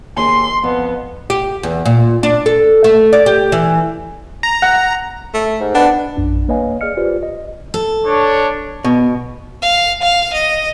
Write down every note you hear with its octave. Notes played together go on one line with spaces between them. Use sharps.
D#2 G#4 C6
F2 B3
G4
E2
A#2
D4
A4
A3
D5
G4
E3
A#5
F#5
A3
G#2
B3 D4
A#1 F#2 D4
A#3 B4 C#5 D#5 F5 G#5
G#4 D5 D#5 F6 C#7
F4 G4 B4 C5 D5
D#5
A4
D4 C#5
B2
F5
F5
D#5